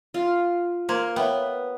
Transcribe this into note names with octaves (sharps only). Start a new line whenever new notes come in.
F4
A#3 C5 C6 G#6
B3 C#5 E5 G5